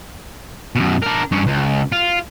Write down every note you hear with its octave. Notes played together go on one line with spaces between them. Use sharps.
F#2 B2
D4 A#4
G2 C#4
C#2
F4